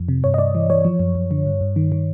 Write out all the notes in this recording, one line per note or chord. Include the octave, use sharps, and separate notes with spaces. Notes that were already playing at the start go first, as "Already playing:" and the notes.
Already playing: F2 F3
C3
G2 C#5
D#5
G2 D5
E3
E3 C#5
F3
F#2
F#2
D3
G2
G2
D#3
D#3